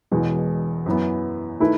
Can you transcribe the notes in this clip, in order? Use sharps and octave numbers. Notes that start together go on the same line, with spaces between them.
E1 E2 B2 G#3
F#2 E3 B3
D#3 A3 E4 B4